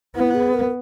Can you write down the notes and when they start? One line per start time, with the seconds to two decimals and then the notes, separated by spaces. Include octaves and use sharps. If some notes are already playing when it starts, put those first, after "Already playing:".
0.16 B3 E4
0.35 G#4
0.54 A#4